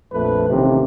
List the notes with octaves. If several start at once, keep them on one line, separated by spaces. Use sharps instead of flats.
A#1 F2 A3 B4
A1 D#2 C3